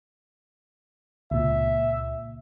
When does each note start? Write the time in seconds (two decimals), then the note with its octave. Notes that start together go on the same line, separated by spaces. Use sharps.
1.31 C#2 A#2 E5